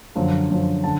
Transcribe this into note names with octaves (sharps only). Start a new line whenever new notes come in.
F#2 D3 F3
F#2 D3 F3
D3 A5